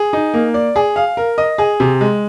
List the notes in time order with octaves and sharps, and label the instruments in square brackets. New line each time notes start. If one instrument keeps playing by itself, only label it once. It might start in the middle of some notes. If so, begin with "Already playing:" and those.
Already playing: [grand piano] G#4
D#4
A#3
D5
G#4
F5
A#4
D#5
G#4
C3
G#3